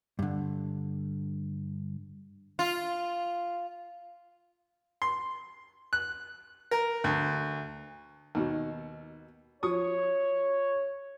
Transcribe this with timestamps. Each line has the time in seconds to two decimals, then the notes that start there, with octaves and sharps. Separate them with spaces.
0.19 G2 D3
2.59 F4
5.02 C6
5.93 F#6
6.71 A#4
7.04 D2
8.35 D#2 B2
9.63 F3 C#5 C#6 D#6